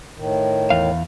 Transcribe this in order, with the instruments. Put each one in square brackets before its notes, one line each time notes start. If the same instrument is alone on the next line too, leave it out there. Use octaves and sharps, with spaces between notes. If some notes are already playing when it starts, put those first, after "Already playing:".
[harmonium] A2 D#3
[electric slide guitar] E2 F5